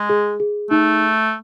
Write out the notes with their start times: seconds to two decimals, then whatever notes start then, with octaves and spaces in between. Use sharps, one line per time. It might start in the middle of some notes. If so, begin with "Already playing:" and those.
Already playing: G#3
0.10 G#4
0.40 G#4
0.70 A3 D#4